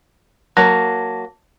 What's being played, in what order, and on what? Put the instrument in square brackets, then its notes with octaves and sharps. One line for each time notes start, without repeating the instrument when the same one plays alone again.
[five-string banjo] F#3 A#3 [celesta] A5 A#6